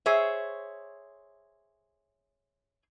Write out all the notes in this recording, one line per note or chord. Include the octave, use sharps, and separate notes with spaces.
G#4 C5 C#5 E5